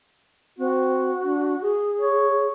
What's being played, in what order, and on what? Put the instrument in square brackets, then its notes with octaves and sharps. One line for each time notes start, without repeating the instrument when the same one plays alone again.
[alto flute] C4 [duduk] F#4
[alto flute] D4
G#4
[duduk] C#5